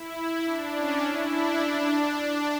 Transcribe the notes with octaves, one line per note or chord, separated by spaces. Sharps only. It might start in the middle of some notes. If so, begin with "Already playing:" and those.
Already playing: E4
D4
C#4
E4
D4
D4